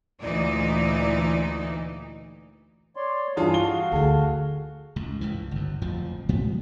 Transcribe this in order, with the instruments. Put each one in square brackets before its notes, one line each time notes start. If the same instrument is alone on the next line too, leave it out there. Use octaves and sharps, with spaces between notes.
[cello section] D2 A#2 E3 D#4 E4 D5
[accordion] C#5 D5 C6
[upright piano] G2 E3 F4 [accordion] D4 G#4 D#6
[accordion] F#4 F5 [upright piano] G7
[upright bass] D2 [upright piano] G#4 A4
[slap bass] C#2 G#2
C#2 G2 E3
G1 F#2
F#1 F2 A2 F3
A2 F#3 G#3 B3